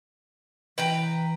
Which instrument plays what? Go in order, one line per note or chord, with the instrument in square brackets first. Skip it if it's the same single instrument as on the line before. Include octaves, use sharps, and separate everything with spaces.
[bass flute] E3 [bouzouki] B4 G5 A#5